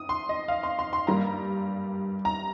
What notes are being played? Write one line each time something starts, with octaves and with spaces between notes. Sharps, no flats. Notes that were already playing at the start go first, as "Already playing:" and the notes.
Already playing: D#6
C6
D#5
F5
C6
C6
C6
G2 G3 A#3 A#5
A#5